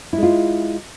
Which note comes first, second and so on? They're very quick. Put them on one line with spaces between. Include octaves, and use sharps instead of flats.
E4 G#3 F4